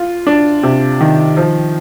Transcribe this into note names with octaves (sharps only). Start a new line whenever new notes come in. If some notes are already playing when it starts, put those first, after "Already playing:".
Already playing: F4
D4
C3
D#3
F3